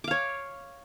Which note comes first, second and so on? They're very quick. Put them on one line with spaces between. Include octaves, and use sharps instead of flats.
D6 F5 C#5